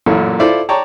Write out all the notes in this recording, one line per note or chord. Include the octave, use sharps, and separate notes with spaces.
A1 F#2 A#2 E4 A4
E4 F4 A4 C5 D5 E5
C#5 D5 G5 A5 A#5